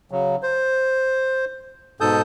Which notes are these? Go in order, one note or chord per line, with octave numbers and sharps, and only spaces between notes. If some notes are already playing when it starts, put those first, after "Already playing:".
C#3 F#3
C5
G#2 B2 A4 A5 D#6 G6